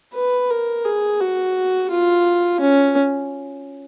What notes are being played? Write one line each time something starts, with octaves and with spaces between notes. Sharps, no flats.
B4
A#4
G#4
F#4
F4
C#4